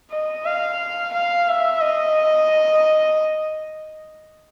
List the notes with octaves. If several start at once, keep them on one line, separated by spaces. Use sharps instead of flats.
D#5
F5
F5
E5
D#5